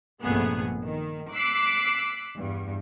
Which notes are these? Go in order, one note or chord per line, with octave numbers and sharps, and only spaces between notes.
A#1 G2 C3 A3 B3 G#4
D#3
D6 E6 F#6 B6 C7
E2 G2